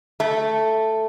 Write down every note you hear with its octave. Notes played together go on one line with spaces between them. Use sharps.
A3